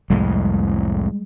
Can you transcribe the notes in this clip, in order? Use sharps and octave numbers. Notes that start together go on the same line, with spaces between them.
C2 F2 A2 G3 G#3